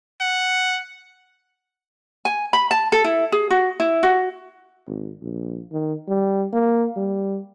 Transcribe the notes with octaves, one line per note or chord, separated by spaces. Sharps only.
F#5
G#5
B5
A5
A4
E4
G#4
F#4
E4
F#4
G#1
A#1
D#3
G3
A#3
G3